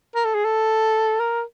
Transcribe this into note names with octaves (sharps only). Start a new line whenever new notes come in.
A#4
A4
G#4
A4
A#4